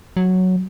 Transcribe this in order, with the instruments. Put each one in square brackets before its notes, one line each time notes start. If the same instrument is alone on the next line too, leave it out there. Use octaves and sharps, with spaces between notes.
[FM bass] F#3